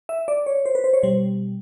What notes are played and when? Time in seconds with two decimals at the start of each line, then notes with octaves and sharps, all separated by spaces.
0.09 E5
0.28 D5
0.46 C#5
0.66 C5
0.75 B4
0.84 C5
0.93 C#5
1.03 B2 G3 C5